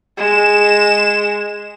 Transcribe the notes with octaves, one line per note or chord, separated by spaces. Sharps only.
G#3 E7